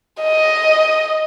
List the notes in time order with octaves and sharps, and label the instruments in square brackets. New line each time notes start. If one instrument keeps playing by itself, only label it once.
[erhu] D#5